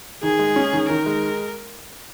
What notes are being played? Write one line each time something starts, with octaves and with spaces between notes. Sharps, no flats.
D#3 G#4
G#3
C#4
D#3
D#3 A#4
G#3